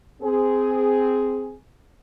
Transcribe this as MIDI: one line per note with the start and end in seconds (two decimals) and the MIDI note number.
0.21 1.55 60
0.21 1.55 68